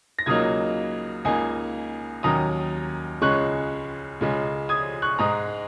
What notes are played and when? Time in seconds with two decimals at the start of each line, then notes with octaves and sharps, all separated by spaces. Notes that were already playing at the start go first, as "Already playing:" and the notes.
0.19 A#6
0.26 C#2 C#3 F#3 A#3 D#4 D#6 G#6
1.25 C#2 C#3 A#3 D#4 D#5 G#5
2.23 D#2 D#3 F#3 C#4 A#5 D#6
3.22 C#2 C#3 G#3 C#4 C#6 F#6
4.21 C#2 C#3 G#3 C#4
4.69 D#6 G#6
5.02 C#6 F#6
5.19 G#2 G#3 D#4 A#5 D#6